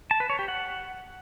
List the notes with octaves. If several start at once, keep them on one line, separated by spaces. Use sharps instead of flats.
A5
B4
C#5
G4
F#5